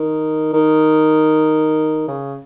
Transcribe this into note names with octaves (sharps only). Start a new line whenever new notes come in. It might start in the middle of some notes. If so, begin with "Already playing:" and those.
Already playing: D#3
D#3
C#3